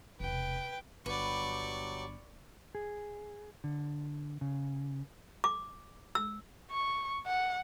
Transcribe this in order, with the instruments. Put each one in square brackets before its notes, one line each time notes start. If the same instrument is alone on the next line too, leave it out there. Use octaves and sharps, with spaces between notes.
[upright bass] E1 C3 [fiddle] B4 G5
[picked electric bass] G1 [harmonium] F#3 G4 [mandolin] B4 [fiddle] D5 C#6
[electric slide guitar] G#4
D3
C#3
[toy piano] D6
E6
[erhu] C#6
F#5